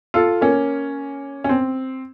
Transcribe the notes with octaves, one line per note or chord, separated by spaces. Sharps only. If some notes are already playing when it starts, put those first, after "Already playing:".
F4 A4
A#3 C#4
C#4
C4